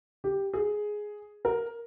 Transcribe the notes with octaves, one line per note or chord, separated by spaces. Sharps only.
G4
G#4
A#4